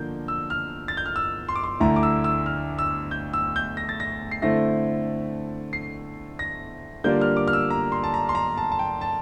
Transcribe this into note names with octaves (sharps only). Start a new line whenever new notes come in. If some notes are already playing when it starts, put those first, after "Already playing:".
Already playing: D3 F3 A#3 G6
E6
F6
A6
G6
F6
E6
C6
D6
C6
D2 D3 A3 E4 A#5
D6
E6
E6
F6
E6
G6
E6
G6
A#6
A6
A#6
C7
D3 A3 C4 E4 A#6
C7
A#6
D3 G3 A#3 D4 F4 G6
F6
D6
F6
E6
A#5
C6
A5
A#5
C6
A#5
A5
A5
G5
A5